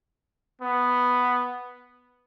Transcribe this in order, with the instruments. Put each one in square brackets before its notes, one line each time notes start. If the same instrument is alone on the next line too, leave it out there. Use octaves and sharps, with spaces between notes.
[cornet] B3